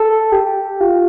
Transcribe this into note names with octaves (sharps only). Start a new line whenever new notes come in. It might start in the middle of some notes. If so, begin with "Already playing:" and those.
Already playing: A4
G4
F4